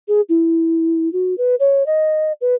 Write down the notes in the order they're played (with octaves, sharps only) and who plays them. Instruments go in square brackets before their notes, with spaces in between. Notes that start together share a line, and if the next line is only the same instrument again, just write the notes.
[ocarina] G#4
E4
F#4
B4
C#5
D#5
B4